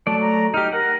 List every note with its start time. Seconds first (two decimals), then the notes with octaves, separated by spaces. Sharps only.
0.07 F#3 A3 D5 A5
0.21 A#5
0.54 D#4 G4 F6
0.72 A#4 F#5